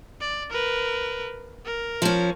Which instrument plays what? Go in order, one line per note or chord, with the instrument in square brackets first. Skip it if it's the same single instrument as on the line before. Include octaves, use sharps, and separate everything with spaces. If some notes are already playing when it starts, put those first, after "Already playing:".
[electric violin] D5
A#4 B4
A#4
[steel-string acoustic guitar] F3 C#4